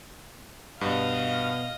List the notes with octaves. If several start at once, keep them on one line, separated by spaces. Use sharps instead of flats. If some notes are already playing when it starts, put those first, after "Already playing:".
G2 B2 B3 D#5 F5